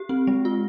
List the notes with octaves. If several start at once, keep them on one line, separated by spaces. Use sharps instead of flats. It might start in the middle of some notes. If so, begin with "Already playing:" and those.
Already playing: G4
C4
G#3
F4